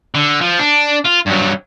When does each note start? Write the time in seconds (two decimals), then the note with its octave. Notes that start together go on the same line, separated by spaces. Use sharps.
0.15 D3
0.41 F3
0.59 D4
1.06 F4
1.27 G2 F#3